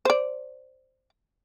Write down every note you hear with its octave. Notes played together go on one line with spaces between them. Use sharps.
C5 D5